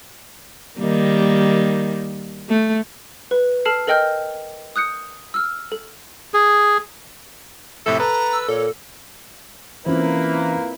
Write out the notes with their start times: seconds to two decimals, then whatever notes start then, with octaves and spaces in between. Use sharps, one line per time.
0.77 D#3 G3 A#3
2.49 A3
3.31 B4
3.65 A4 A5 F6 C7
3.87 A4 A#4 D#5 G5 F6 G6
4.76 D#6 F#6 G6 C#7
5.34 E6 F6
5.72 A4
6.34 G#4
7.86 F2 A2 C3 A4 E5
8.00 A4 B4 A#5
8.33 E6
8.49 A#2 A4 C#5
9.86 E3 A#3 C4 C#4 E4 F4 B4 C5